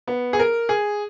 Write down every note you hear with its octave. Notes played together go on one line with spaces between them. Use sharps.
B3
G#4
A#4
G#4